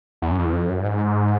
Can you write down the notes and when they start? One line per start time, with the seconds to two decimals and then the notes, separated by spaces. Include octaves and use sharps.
0.22 E2
0.31 F#2
0.38 F2
0.46 E2
0.53 F2
0.69 F#2
0.80 G2
0.85 G#2